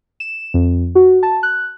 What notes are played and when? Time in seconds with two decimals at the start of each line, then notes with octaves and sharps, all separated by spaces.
0.20 E7
0.54 F2
0.95 F#4
1.23 A5
1.43 F#6